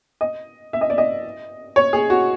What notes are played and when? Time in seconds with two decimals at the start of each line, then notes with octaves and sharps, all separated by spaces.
0.21 D#5
0.73 E5
0.81 D#5
0.90 D5
0.98 D#5
1.76 C#5
1.93 G#4
2.10 F#4